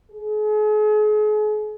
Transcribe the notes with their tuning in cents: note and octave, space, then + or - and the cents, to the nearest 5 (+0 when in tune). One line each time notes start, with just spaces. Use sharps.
G#4 +40